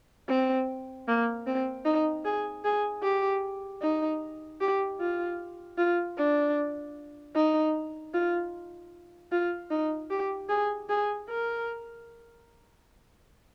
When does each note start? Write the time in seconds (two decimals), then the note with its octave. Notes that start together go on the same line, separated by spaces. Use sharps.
0.29 C4
1.08 A#3
1.47 C4
1.85 D#4
2.25 G#4
2.64 G#4
3.03 G4
3.82 D#4
4.60 G4
5.00 F4
5.78 F4
6.18 D4
7.35 D#4
8.14 F4
9.32 F4
9.70 D#4
10.10 G4
10.49 G#4
10.89 G#4
11.29 A#4